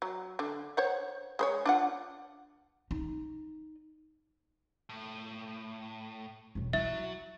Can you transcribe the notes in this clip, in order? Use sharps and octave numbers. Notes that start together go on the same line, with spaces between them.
F#3
D3
C5 C#5 F#5
G#3 C5 C#5
D4 F4 F#5
D#4
A2
E1 B1
F#3 E4 E5